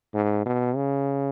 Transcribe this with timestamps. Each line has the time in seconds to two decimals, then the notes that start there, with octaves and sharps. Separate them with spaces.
0.14 G#2
0.46 B2
0.76 C#3